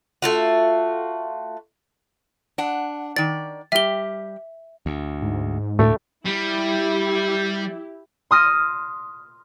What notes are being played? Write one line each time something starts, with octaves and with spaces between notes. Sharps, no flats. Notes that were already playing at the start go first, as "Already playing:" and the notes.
A3 F4 F#4
D4 F#5
D#3 D5 A6
G3 G4 E5 G7
D2
G#2
D2 A2 A3
G3 E4 G4
C6 D#6 F6 A#6 D#7 E7